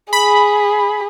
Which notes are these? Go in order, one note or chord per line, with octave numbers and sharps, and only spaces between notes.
G#4 B5